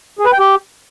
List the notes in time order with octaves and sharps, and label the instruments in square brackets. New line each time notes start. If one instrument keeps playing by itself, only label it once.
[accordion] G#4
B4
G5
G4